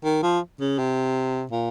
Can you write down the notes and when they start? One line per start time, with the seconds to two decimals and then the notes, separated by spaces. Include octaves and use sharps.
0.04 D#3
0.23 F3
0.60 C#3
0.78 C3
1.51 A#2